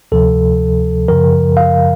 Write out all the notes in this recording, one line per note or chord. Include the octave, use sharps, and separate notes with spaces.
D2 C3 F3 A4
F#2 C#3 F3 A#4
F5